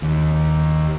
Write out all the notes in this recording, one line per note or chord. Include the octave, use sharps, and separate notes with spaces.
D#2